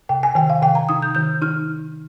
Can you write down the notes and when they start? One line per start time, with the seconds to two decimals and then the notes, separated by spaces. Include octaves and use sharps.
0.09 C3 G5
0.23 G#5
0.35 D#3 G5
0.50 F5
0.62 C3 G5
0.75 A#5
0.89 D#4 D#6
1.02 G6
1.15 D#3 G6
1.42 D#4 F6